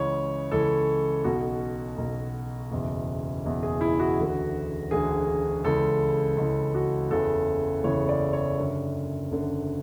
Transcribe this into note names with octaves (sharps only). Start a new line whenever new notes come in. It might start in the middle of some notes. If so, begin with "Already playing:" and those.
Already playing: C#2 C#3 E3 C#5
C#2 C#3 E3 A4
B1 B2 F#4
B1 B2
F#1 E2 B2
F#1 E2 B2
G#4
E4
F#4
E1 D2 D3
E1 D2 D3 G#4
C#2 C#3 E3 A4
C#2 C#3 E3
F#4
F#1 E2 C#3 E3 A4
F#1 E2 C#3 E3 C#5
D5
C#5
F#1 F#2 D3
F#1 F#2 D3